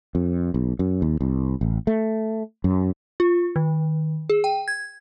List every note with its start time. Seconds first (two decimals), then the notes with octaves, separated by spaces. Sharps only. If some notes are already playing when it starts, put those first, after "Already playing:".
0.15 F2
0.54 B1
0.79 F#2
1.02 D#2
1.21 C2
1.61 A1
1.87 A3
2.64 F#2
3.20 F4
3.56 D#3
4.30 G#4
4.44 G5
4.68 G#6